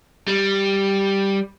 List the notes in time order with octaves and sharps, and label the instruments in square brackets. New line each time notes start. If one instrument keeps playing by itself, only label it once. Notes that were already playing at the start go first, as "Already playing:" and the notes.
[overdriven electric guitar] G3